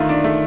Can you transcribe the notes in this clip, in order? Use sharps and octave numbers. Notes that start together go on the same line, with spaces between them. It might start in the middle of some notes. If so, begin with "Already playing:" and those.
Already playing: D3 D#3 A3 F4
D4
A3